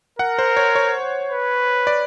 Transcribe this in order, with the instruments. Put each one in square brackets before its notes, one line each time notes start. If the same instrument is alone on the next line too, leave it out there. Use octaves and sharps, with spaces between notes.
[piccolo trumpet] A#4 [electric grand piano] F#5
[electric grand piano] C5
C#5
C#5
[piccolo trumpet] B4
[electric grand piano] D5